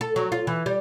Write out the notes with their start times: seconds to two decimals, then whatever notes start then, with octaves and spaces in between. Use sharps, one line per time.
0.01 A4
0.16 F#3
0.32 F4
0.47 E3
0.66 G3